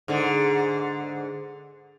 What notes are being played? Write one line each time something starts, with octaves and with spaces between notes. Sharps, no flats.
G#2 D3